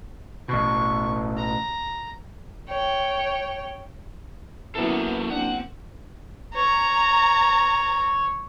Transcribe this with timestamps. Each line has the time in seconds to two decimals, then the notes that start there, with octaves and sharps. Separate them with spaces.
0.48 A1 B2 C#6
1.37 A#5
2.69 C#5 G5
4.75 E3 F#3 A#3 B3 C#4 E4 A4
5.30 A#3 C4 D4 F#5
6.56 C#5 A#5